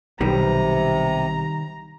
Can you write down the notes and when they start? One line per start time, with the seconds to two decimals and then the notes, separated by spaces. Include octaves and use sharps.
0.21 B1 C3 D#3 G3 B3 A#5